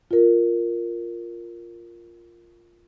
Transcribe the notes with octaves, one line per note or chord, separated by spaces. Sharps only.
F4 A#4